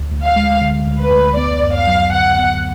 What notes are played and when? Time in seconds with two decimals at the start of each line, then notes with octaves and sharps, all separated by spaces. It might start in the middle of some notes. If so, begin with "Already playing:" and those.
Already playing: D2
0.11 D2
0.23 F5
0.36 G#3
0.61 D3
0.87 D2
0.99 B4
1.12 D2
1.36 B3 D5
1.63 F#2
1.75 F5
1.87 F#3
2.13 D3 F#5
2.38 B3